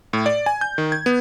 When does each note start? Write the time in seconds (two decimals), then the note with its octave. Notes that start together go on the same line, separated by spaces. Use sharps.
0.13 A2
0.26 D5
0.46 G#5
0.61 G6
0.78 D#3
0.92 G#6
1.06 B3